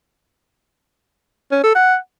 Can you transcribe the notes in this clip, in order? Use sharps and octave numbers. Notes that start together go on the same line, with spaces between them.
C#4
A4
F#5